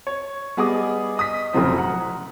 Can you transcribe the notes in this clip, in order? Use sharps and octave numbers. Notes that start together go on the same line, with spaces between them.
C#5
G3 B3 G#4 D#5 D6 D#6
D#5 D#6 B6
F1 F2 C#3 F#3 C5
F#5 A#5